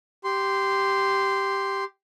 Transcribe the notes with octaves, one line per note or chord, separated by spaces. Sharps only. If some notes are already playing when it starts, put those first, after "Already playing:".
G4 C6